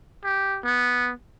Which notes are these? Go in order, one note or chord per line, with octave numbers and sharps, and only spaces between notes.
G4
B3